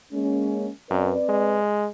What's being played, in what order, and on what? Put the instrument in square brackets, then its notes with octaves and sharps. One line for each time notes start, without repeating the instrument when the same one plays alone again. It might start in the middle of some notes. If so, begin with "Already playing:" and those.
[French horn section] G#3 A#3 C#4
[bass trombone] F#2 [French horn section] C4 B4 D5
[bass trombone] G#3